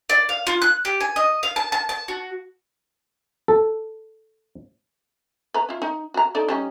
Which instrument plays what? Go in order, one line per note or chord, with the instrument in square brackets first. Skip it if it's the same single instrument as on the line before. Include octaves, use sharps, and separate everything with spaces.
[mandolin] D5
F5
F4
F#6
G4
G#5
D#5
F5
A5
A5
A5
F#4
[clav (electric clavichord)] A4
[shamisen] B4 A#5
E4 F4
D#4
F#4 A#5
D#4 A4 D5
G3 C#4 D#4